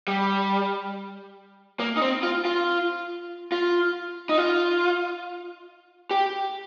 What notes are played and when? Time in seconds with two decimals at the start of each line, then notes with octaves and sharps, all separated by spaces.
0.08 G3
1.80 A#3
1.97 D#4
2.02 C4
2.23 F4
2.45 F4
3.52 F4
4.29 D#4
4.38 F4
6.11 G4